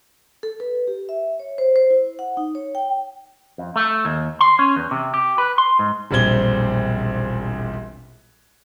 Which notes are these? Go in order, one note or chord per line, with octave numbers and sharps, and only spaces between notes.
A4
B4
G4
E5
C#5
C5
C5
E4
F#5
D#4
C#5
G5
F2
A3
D#2
C6
C#4
E2
C3
G4
B4
C6
G#2
E1 A#1 G3 C4 G#6 G7